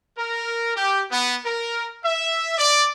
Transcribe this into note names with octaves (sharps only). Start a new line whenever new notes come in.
A#4
G4
B3
A#4
E5
D5